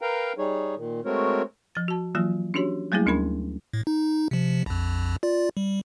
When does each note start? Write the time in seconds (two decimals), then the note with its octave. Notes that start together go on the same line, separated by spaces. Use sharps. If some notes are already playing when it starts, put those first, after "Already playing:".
0.01 A#4 B4 F5 G5 A#5
0.38 G3 D#4 G#4 C#5
0.76 A#2 D#3
1.05 G#3 A3 C4 F#4 A#4 C#5
1.75 F3 A6
1.88 F#4 A5
2.15 E3 F#3 A#3 F4
2.54 C#4 D4 F#4 G4 C#5
2.92 F#3 G3 A3 A#3 E4 G#4
3.06 D2 C#4 D4 A#4 B5
3.73 A2
3.87 D#4
4.31 C3 F3
4.66 A#1 F2
5.23 F4 D5
5.57 G3